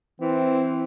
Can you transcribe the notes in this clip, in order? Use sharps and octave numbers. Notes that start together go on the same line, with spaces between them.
E3 C4